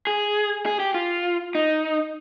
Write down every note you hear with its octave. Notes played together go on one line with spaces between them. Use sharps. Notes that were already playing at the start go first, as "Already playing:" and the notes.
G#4
G#4
G4
F4
D#4